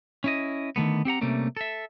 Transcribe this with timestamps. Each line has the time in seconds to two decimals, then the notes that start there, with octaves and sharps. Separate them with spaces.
0.24 C#4 E4 D#5
0.76 D3 D#3 A3 B3
1.05 C4 G4 F#5 A#5
1.21 C3 G3 A3 A#3 C#4
1.57 A4 E5